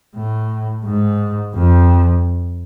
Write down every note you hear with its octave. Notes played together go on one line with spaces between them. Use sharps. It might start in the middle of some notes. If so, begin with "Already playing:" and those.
A2
G#2
F2